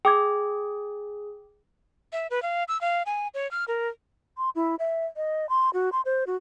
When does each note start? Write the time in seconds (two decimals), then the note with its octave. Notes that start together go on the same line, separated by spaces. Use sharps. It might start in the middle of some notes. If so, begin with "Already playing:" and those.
0.05 G#4 G5 D6 G#6
2.13 E5
2.31 B4
2.42 F5
2.68 E6
2.81 F5
3.06 G#5
3.34 C#5
3.51 F6
3.68 A#4
4.38 C6
4.56 E4
4.79 E5
5.16 D#5
5.49 C6
5.74 F#4
5.92 C6
6.05 C5
6.27 F#4